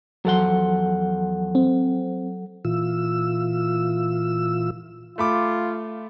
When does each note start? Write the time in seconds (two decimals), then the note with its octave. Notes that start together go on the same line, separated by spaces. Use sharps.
0.25 E2 F3 F#3 A4 F#5 C6
1.55 C4
2.65 A#2 E3 F4 E6
5.18 A3 F4 B5 D6